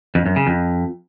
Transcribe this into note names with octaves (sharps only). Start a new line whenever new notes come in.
F2
F#2
C#3
F2